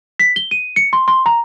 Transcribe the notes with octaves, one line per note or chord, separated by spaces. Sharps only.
B6
G7
D#7
C#7
C6
C6
A#5